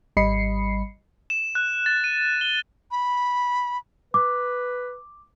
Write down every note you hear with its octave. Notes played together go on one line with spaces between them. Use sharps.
G#1 G3 D#5 B5 C7 C#7
E7
F#6
A6
D#7
G7
B5
B4 D6